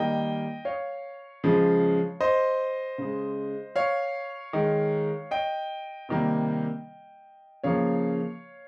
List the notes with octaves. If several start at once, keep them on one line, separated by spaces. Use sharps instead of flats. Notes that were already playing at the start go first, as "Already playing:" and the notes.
Already playing: D#3 G3 A#3 D#5 G5
C#5 F5
C#3 F3 G#3
C5 D#5
C#3 G#3
C#5 F5
D#3 G#3
D#5 G5
C3 D#3 G3 A#3
C#3 F3 A#3 C#5 F5